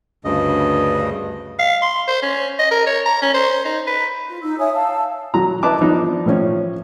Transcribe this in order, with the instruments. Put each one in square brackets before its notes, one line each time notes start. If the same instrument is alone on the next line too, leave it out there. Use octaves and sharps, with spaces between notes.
[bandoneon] D2 G2 C#3 D#5
[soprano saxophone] F5
C6
C5
C#4
D#5
A#4
C#5
A#5
C#4
C5
D#4
B4
[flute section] F4
D#4 E6
C#5 E5 G#5 D#6
F5 A5 E6
[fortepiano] F#3 A#5
E4 B4 D#5 A5 D6
F3 B3 D4 D#4
A2 F3 C#4